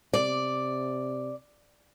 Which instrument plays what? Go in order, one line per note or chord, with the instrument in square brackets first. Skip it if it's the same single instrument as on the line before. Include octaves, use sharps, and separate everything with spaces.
[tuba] C3 [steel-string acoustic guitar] D5